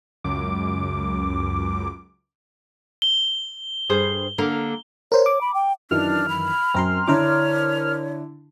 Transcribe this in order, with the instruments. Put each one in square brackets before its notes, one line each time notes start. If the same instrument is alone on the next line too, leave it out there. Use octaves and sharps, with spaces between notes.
[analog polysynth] C#2 F#2 D6
[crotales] G7
[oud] G2 G#4 C5
D3 A#3
[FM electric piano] A#4 C5 [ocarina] C#5
[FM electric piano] D6
[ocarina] B5
G5
[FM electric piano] F#2 D#3 E3 [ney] D4 [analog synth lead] F6
[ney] B5
[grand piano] F#2 [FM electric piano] C4 A#4 C6
[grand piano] D3 D4 E4 [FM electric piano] A#4 C5 D6 [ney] C#5